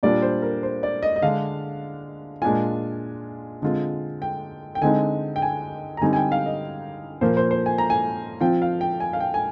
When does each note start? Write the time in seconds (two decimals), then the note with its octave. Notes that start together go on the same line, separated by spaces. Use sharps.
0.03 A#2 G3 D4 F4 D5
0.22 C5
0.42 A#4
0.63 C5
0.83 D5
1.02 D#5
1.16 D#5
1.22 D3 G#3 D4 F5
2.42 A#2 G#3 D4 F4 G#5
3.62 D3 G#3 C4 F4
4.22 G5
4.75 G5
4.82 D3 G#3 C4 D#4 G#5
5.36 G5
5.42 G#5
5.97 A#5
6.01 D3 G3 C4 D#4 G#5
6.13 G#5
6.16 G5
6.32 F5
6.46 D#5
7.21 A#2 F3 A#3 C5
7.37 C5
7.51 C5
7.66 G#5
7.78 A#5
7.90 G#5
8.40 F3 C4 F4 G5
8.62 F5
8.81 G5
9.00 G#5
9.13 F5
9.20 G5
9.34 G#5